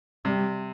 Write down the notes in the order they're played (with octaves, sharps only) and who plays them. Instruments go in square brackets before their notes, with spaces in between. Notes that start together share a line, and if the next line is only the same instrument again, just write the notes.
[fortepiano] C3 [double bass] G3